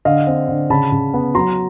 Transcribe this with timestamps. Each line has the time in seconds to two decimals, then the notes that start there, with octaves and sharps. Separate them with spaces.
0.05 D3 D#5 F5
0.27 C4
0.48 D3
0.70 C#3 A5 B5
0.92 C#3
1.14 B3
1.35 F#3 A#5 C6